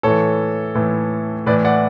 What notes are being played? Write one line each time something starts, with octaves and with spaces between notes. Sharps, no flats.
A2 E3 A4 C#5
A2 E3
A2 E3 B4 D5
D5 F#5